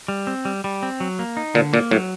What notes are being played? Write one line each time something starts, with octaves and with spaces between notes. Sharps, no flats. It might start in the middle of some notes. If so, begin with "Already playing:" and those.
G3
C4
G3
G3
C4
F#3
A#3
D#4
A#2 D3
A#2 A#3
A2 F#3